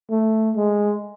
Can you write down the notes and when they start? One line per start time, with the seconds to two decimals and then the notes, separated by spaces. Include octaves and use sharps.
0.11 A3
0.56 G#3